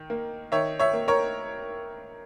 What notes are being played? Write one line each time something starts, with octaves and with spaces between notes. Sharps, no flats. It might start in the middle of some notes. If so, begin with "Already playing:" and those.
Already playing: D#3
A#3
D#3 C#5 E5
C#5 E5
A#3
A#4 C#5